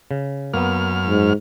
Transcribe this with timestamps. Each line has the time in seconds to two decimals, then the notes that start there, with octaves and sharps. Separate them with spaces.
0.11 C#3
0.54 F#2 A#3 B3 F6
1.07 G#2